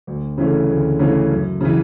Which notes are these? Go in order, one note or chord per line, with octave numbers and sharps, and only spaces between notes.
D2
C#3 E3 A3 C#4
D2
C#3 E3 A3 C#4
F#2
C#3 E3